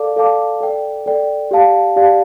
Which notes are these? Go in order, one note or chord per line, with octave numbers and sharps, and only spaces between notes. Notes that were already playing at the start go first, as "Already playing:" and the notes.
Already playing: A4 D5 F5 A5 D6
A4 D5 F5 A5 D6
A4 D5 G5
A4 D5 G5
G4 D5 F5 A5
G4 D5 F5 A5